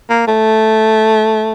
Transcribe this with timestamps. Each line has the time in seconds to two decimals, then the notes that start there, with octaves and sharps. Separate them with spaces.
0.10 A#3
0.27 A3